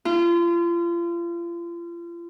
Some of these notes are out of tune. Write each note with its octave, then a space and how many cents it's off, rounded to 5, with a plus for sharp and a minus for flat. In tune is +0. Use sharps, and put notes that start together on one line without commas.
F4 -35